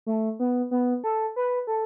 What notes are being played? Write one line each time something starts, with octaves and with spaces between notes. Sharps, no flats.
A3
B3
B3
A4
B4
A4